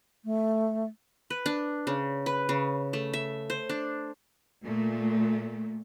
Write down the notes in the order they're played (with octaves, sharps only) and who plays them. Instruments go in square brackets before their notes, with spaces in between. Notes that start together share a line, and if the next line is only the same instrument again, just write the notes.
[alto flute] A3
[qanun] B4
D4
C#3
B4
C#3
A3
E5
C5
D4
[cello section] A#2 A3